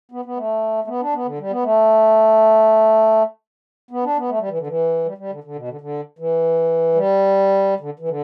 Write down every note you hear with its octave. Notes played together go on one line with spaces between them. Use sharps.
B3
B3
A3
A3
B3
D4
B3
D3
G3
B3
A3
B3
D4
B3
A3
G3
E3
D3
E3
G3
G3
D3
D3
B2
D3
D3
E3
G3
D3
E3
D3